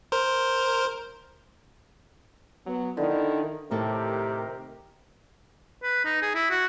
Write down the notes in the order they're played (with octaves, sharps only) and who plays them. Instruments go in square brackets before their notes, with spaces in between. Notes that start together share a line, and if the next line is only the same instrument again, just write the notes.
[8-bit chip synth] A#4 C5
[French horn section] F#3 B3
[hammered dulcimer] D3 [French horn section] D#3 E4
[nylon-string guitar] A2 E4 A4 [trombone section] C3 D#3 G4 [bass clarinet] A#4
[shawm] B4
D#4
G#4
E4
F#4